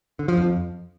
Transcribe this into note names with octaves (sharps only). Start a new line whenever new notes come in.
D3
F3
F2